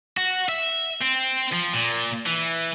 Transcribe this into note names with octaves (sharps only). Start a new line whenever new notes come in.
F#4
E5
C4
F3
A#2
E3